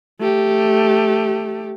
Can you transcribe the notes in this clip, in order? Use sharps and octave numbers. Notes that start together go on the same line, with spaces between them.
A3 G4